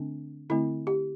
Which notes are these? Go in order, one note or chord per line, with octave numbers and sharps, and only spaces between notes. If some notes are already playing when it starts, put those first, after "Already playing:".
Already playing: D3 A3 C4 D4
D3 A3 C4 E4
G4